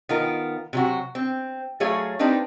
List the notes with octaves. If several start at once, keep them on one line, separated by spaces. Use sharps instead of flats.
D#3 B3 F4 A#4
C3 F#3 F#4
C4
F#3 A3 G#4 C#5 F5
A#3 C4 D4 D#4 G4 B4